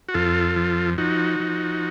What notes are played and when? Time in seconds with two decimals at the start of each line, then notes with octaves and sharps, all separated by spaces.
0.09 F#4
0.14 F2 F4 A4
0.56 F3
0.98 F3 D#4 F#4
1.40 F3